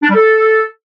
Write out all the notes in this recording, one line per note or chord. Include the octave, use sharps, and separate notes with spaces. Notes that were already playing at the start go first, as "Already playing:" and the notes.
D4
G3
A4